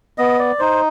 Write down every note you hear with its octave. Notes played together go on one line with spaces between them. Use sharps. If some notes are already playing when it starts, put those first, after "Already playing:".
B3 D#5
D5
D#4 C5